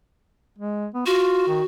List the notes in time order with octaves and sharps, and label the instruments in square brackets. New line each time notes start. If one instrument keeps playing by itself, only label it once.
[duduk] G#3
B3
[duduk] F4 [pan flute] F#4
[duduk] D#3